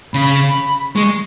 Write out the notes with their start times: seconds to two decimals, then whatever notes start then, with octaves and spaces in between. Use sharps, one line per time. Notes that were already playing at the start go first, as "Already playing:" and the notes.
0.13 C#3 B5
0.96 G#3 C#6